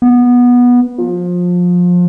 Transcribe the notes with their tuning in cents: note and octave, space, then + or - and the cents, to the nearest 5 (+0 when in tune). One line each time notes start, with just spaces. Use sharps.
B3 -15
F3 +25